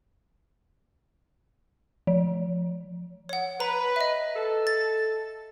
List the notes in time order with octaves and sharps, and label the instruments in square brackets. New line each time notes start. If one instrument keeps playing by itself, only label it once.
[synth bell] F3
[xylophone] C#5 F#5
[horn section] B4 [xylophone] A#5
[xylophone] D#5 E5
[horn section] A4
[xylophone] A6